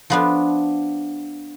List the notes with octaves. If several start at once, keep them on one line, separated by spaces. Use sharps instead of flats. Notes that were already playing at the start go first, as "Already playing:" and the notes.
F3 B3 D4